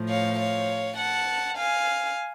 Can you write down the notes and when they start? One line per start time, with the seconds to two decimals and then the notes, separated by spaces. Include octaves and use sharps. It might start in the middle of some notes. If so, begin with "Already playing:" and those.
Already playing: A2 F3
0.09 C#5 F5
0.38 C#5 F5
0.97 F#5 A5
1.57 F5 G#5